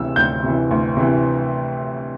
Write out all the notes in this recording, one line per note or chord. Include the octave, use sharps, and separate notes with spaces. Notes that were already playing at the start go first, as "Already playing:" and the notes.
Already playing: D2 C3 E3 E6
D2 G6
C3 E3
D2
C3 E3